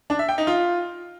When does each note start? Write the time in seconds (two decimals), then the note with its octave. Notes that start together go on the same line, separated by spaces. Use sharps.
0.10 D4
0.19 E5
0.28 G5
0.38 D#4
0.47 F4